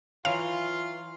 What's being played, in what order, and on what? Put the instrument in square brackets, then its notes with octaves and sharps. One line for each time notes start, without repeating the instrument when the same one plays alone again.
[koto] E3 F#3 [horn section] F4 [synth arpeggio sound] F5